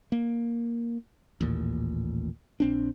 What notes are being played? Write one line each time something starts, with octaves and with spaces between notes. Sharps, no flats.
A#3
A1 D#2 A#2
A#1 C4 D4